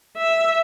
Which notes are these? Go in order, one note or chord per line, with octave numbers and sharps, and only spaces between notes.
E5